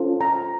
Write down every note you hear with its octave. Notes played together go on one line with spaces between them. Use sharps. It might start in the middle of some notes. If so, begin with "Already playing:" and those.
Already playing: C#4 F4 A4 C5
A#5